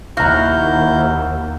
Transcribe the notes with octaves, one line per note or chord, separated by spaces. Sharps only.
D#2 E4 F#4 F5 A#5 G6